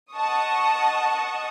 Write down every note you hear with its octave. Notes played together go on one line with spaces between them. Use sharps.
D#5 F#5 A5 C#6 D#6